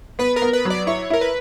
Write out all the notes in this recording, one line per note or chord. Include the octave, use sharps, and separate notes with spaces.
B3 B4
A#4
B3
B4
F#3
D5
E4 C#5
E4 A#4
B4